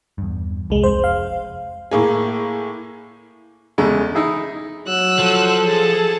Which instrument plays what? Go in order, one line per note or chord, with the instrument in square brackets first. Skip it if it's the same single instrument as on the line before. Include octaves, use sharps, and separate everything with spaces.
[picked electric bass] E2 G2
[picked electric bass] E1 [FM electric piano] C2 G#3
[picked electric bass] F1 F2 [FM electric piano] C5
[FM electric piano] F5
[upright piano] A2 A#3 G#4
[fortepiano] E2 C#3 G#3 A4
D#4 E4 G#4
[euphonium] F#3 [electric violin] E6 F#6
[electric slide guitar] F3 [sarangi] A4
[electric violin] G#4 A5